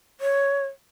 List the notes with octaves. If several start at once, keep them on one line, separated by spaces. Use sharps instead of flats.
C#5